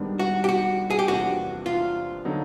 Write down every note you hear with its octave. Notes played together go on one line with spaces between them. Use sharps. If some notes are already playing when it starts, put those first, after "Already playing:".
Already playing: G#2 D#3 G3 B3 D4
F#4
G4
F#4
G#4
G4
E2 C3 F3 A#3 D4 F#4
F4
D3 F#3 B3 D#4